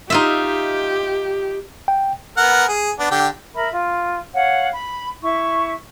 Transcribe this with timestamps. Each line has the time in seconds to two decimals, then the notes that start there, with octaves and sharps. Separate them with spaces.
0.10 D#4 F4 G4 E5
1.88 G5
2.37 B3 A#4 F#5
2.68 G#4
2.99 B3 D4
3.11 D3 G4 G5
3.54 A#4 E5 B5
3.72 F4
4.34 C#5 F5 F#5
4.73 B5
5.22 E4 C#6